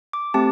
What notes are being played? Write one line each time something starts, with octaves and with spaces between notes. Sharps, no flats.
D6
A3 C4 G4 A5